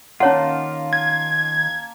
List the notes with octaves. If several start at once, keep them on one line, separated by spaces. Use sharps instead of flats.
D#3 A#3 C#4 F4 C#5 F#5 A5
G#6